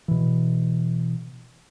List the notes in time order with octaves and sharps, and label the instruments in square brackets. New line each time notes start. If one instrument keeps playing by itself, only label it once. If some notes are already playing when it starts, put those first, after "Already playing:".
[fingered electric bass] B2 E3